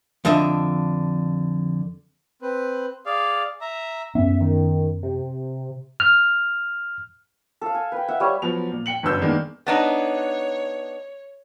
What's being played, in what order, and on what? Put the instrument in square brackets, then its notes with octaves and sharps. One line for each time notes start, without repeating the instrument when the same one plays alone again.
[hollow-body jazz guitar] F2 D3 D#5 E5
[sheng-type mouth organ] C4 B4
G#4 D5 F5
E5 A#5
[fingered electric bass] F#2 B3 C#4 [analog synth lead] E5
[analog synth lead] D#3
C3
[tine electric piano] F6
[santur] A4 F5
G#5
B4 G5
E5 F#5
G3 C#5
[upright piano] F3 F#3 B3 F7
A#2
G5 C#7 F#7
G1 F#2 B4 E6 G6
D#3 G#3 A#3 B3 D4
[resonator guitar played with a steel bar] B3 D4 D#4 [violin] C#5